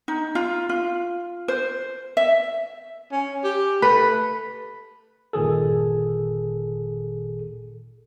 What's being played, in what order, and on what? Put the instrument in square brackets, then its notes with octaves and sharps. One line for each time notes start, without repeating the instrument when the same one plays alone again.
[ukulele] D#4
F4
F4
C5
E5
[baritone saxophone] C#4
G4
[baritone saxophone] A3 [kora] B4
[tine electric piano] G1 A#2 D#3 G#4 A4